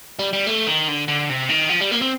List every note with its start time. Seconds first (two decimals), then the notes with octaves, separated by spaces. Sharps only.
0.19 G3
0.33 G3
0.47 A3
0.67 D#3
0.88 D3
1.08 D3
1.30 C3
1.50 D#3
1.70 F3
1.81 G3
1.92 A#3
2.02 C4